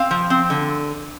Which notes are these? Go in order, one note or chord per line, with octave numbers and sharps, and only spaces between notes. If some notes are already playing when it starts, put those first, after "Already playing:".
Already playing: C4 F5
F3
C4
D3